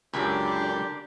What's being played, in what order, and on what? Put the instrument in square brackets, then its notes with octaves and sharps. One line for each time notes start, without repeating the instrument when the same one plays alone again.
[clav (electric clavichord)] C#2 F#2 [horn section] D3 G4 [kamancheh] D4 [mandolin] A#4 G#5 B5